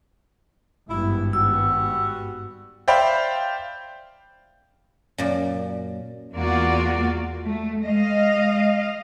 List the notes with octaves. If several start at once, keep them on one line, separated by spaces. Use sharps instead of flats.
G#1 G2 B3 E4
G3 F#4 E6
C5 D5 E5 F5 G5 B5
F#2 A#2 D5
E2 A#3 F4 F#4 D5
A3
G#3 D#5 F5